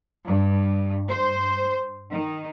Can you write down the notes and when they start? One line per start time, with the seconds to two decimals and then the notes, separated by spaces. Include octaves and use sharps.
0.25 G2
1.09 C5
2.11 D#3